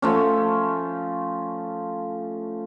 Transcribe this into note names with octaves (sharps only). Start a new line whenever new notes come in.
F3 A3 C#4